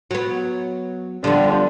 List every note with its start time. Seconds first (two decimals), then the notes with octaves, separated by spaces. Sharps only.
0.11 F#3 B3
1.24 D3 F3 G3 B3